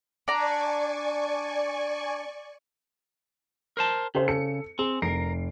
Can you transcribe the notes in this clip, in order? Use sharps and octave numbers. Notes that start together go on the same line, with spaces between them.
D4 D5 G#5 A#5 C#6
A#4 C5 A5
C#3 G4 A4 C5
A4 C#7
C4 G#4
F1 A#4 C7 D7